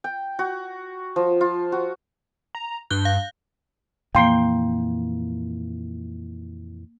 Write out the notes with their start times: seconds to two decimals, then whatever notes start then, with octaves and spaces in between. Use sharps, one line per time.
0.04 G5
0.39 F#4
1.16 F3
1.41 F4
1.72 F#4
2.55 A#5
2.91 G2 F#6 G6 G7
3.05 F5
4.15 F2 A#2 E3 A#3 F5 G5 C6